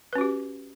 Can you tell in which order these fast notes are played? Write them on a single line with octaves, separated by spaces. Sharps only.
B4 C#4 F#4 G4